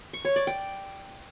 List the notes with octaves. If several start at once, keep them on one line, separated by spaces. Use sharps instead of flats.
C#6
C#5
D5
G5